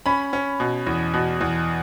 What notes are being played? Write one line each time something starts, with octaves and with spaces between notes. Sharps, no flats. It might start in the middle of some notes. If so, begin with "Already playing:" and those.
C#4 B5
C#4
B2
E2
B2
E2